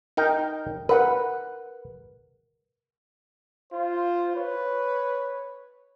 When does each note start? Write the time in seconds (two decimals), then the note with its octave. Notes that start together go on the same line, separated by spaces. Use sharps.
0.17 D#4 A#4 G5
0.89 A#4 B4 F#5
3.72 F4 C5
4.36 B4 C#5